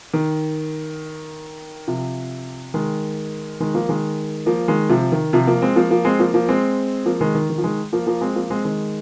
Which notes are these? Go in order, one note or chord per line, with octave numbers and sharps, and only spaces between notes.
D#3
C3 F3
D#3 G#3
D#3 G#3
F3 A#3
D#3 G#3
F3 A#3
D#3 G#3
C3 F3
D#3
C3 F3
F3 A#3
G#3 C4
F3 A#3
F3 A#3
G#3 C4
F3 A#3
F3 A#3
G#3 C4
F3 A#3
D#3 G#3
D#3
D#3
F3
D#3 G#3
F3 A#3
F3 A#3
G#3 C4
F3 A#3
G#3 C4
D#3 G#3